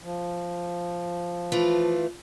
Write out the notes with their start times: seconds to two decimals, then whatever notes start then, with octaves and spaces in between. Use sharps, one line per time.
0.04 F3
1.52 E3 A3 F4